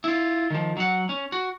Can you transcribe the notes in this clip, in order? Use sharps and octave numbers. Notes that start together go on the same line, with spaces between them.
E4 F4
D#3 F3
F#3 F#5
C#4
F#4